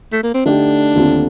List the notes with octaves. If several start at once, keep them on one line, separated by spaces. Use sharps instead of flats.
A3
A#3
C4
D3 A3 D4 D#4 G4
D#2 D3 A3 C4 F4